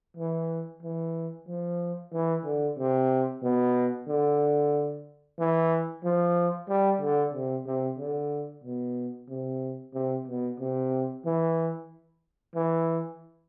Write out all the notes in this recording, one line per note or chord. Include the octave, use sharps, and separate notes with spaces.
E3
E3
F3
E3
D3
C3
B2
D3
E3
F3
G3
D3
C3
C3
D3
B2
C3
C3
B2
C3
E3
E3